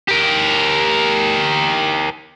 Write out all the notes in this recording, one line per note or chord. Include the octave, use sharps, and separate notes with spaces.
G4 A#4